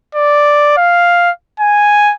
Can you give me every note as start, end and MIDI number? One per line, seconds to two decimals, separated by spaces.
0.15 0.75 74
0.77 1.31 77
1.60 2.14 80